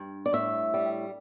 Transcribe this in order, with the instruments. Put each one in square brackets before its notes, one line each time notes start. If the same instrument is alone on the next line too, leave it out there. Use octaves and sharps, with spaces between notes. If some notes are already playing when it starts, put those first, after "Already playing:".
Already playing: [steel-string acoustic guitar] G2
D5
A2 E5
G3